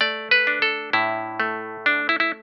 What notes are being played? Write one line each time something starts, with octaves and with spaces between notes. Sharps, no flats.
A3 D5
B4
D4
A4
A2 E4
A3
D4
E4
E4